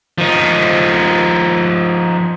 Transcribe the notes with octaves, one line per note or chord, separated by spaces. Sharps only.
F3 D#4